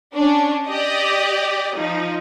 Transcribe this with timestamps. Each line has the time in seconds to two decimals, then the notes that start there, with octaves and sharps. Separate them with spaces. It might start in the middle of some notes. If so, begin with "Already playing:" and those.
0.15 C#4 D4
0.68 G4 D5 D#5
1.77 F3 D#4